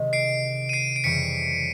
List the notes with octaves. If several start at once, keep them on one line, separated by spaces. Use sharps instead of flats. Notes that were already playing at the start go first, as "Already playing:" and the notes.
Already playing: C3 D#3 G#3
C7 D7
D#7
C7 D7
D7
F2 C#3 E3 G3 B6 C#7